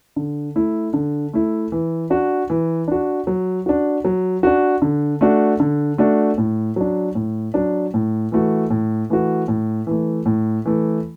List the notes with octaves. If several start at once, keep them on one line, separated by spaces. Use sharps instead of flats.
D3
A3 E4
D3
A3 E4
E3
D4 F#4
E3
D4 F#4
F#3
D4 F#4
F#3
D4 F#4
D3
A3 D4 F#4
D3
A3 D4 F#4
A2
F#3 D4
A2
F#3 D4
A2
E3 A3 F#4
A2
E3 A3 F#4
A2
E3 A3
A2
E3 A3